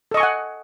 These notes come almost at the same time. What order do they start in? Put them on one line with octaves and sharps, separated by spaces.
A4 D#5 C#6 G#5 F#5